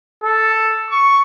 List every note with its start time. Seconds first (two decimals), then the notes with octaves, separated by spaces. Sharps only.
0.23 A4
0.90 C#6